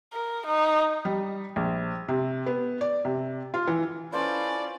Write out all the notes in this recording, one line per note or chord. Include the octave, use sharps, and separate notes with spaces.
A#4
D#4
G3
A#1
C3
B3
D5
C3
F4
E3
C#4 E4 F4 A4 B4 C5 D5 D6